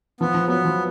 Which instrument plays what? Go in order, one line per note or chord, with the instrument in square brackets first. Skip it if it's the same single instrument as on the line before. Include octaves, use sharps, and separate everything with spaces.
[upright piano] F3 [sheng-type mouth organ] B3
[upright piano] F3
[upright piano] F#3 [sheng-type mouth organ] B3
[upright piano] F3